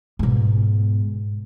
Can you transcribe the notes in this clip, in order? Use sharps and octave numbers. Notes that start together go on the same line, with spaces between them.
G#2 B2